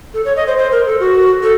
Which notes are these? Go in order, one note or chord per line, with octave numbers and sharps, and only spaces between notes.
A4
C#5
D#5
C5
C5
A#4
A4
F#4
A4